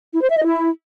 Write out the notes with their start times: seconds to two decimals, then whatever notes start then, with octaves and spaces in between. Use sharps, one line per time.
0.14 E4
0.21 C5
0.29 E5
0.37 D#5
0.44 E4